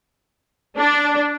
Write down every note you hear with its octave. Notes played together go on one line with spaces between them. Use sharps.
D4